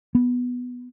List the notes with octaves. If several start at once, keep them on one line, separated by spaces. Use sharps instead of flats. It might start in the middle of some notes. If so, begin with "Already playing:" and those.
B3